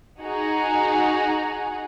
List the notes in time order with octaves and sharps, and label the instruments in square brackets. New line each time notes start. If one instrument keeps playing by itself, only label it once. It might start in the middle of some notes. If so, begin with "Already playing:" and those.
[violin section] D#4 F#4 G#4 F#5 G#5 A#5